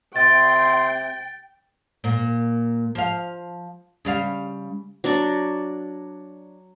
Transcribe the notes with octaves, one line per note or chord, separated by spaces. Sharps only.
C3 G5 C6 A6
A#2 A#3
F3 F5
C#3 G3 F5
F#3 D4 D5 C#6